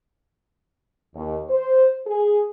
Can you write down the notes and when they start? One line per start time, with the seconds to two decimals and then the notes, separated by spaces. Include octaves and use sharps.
1.14 D#2
1.49 C5
2.06 G#4